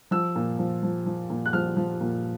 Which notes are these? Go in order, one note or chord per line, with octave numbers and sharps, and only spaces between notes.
F3 E6
A#2
F3
F3
F3
A#2
F#6
F3 F6
F3
A#2